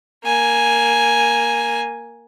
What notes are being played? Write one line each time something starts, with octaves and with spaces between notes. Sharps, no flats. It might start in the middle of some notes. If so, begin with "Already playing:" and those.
A#3 G#5